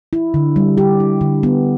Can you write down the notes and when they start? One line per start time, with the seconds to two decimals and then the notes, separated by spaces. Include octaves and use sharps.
0.13 E4
0.34 D3
0.56 G3
0.78 G4
1.00 E4
1.21 D3
1.43 B3